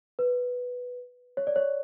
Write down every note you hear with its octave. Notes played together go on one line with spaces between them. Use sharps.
B4
C#5
D5
C#5